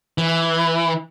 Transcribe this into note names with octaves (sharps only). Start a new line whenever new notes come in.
E3